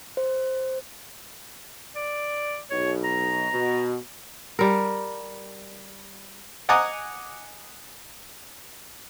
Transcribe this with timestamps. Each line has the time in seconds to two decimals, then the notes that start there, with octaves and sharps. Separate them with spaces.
0.17 C5
1.96 D5
2.71 B1 B2 C#5
3.04 A#5
3.52 B2
4.59 G3 A#4
6.69 D#5 F#5 G#5 A#5 D6 D#6